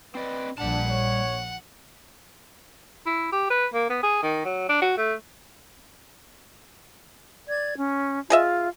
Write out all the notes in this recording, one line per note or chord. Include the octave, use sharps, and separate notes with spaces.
C4 B4 D5 D#5
A#1 G3 D4 F#5 A5
C#5
E4
G4
B4
A#3
B3
G#4
D#3
F#3
D4
F#4
A3
D5 G#6
C#4
F4 G#4 D#5 E5